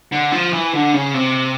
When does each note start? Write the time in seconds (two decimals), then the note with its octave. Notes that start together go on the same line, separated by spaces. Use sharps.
0.12 D3
0.32 F3
0.53 E3
0.73 D3
0.93 C#3
1.14 C3